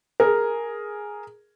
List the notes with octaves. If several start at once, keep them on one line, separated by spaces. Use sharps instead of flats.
G#4 A#4